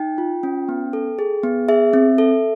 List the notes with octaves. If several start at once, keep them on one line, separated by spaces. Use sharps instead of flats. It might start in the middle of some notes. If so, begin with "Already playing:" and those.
Already playing: D#4 G5
F4
C#4
B3
A4
G#4
B3
G#4 E5
C4
A4